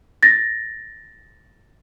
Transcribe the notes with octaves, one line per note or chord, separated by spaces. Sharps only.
A6 A#6